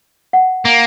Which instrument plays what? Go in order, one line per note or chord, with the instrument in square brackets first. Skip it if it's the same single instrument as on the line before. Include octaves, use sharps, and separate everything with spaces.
[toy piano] F#5
[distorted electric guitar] A#3